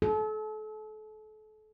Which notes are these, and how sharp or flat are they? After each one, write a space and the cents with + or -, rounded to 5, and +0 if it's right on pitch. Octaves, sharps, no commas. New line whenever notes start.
A4 -35